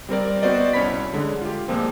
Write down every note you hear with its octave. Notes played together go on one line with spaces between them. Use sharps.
G3 C4 A#4 D5
B3 C4 F#4 C5 D5 D#5
C2 C#4 C#5 D5 B5 B6
D3 G#3
F4 G4
A#2 F3 G#3 A#3 C4